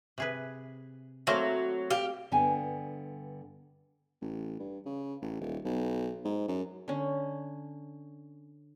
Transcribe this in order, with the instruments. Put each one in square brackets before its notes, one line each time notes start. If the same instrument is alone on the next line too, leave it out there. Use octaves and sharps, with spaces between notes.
[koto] C3 G#4 B4
[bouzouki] F#3 [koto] A3 A#3 C4
[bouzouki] G4 F5
[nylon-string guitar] G2 D3 B3 F5 G5 G#5
[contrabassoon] A1
G2
C#3
A1
D#1
B1
G#2
F#2
[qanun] D3 C#4